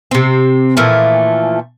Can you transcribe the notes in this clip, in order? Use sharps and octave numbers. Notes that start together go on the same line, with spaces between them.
C3 C4
A#2 E3 F3 A3